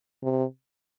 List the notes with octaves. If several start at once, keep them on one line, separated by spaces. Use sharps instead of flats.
C3